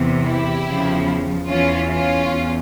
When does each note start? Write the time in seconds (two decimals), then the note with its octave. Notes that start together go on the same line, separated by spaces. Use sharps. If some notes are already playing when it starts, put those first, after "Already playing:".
Already playing: E2 C3 E3
0.24 E4 G4
0.66 E2 C#3 F3
1.48 E2 E3 C#4 F4
1.90 C#4 F4
2.31 E2